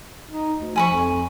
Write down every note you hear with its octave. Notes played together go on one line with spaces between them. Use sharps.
D#4
D2
F3 G#5 B5 C#6
F2